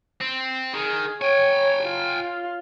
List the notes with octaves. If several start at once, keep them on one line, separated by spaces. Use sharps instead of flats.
C4
D#3 G#4
C#5 G5 G#5
F4